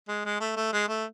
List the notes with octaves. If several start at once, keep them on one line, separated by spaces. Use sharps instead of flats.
G#3
G#3
A3
A3
G#3
A3